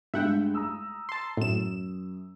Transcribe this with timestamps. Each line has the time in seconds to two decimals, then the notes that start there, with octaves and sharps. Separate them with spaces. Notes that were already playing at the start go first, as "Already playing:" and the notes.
0.14 G2 G#3 A3 E5 F#5 G5
0.54 A#5 D#6 E6
1.09 A5 C6
1.37 F#2 A2 E7